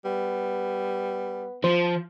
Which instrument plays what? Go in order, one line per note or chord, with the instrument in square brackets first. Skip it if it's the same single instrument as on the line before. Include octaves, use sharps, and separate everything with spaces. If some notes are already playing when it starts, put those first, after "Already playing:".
[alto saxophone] G3 [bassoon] B3
[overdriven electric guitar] F3 [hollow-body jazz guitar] C5